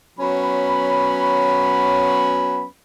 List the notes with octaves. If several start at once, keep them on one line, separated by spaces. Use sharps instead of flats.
F#3 B3 C#4 B5